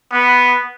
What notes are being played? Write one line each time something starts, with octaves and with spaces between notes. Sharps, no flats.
B3